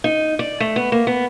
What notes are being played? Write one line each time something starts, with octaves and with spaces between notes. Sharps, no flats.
D#4
D5
A3
B3
A#3
B3